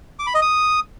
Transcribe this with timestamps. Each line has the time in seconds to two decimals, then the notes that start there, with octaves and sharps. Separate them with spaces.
0.19 D6
0.27 B5
0.34 D#5
0.42 D#6